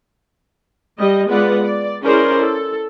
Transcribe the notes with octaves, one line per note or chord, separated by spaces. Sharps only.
G3 D#5
G#3 B3 F4 B4 D5 F#5
D5
C#4 E4 G#4 A#4 C5 D5
A4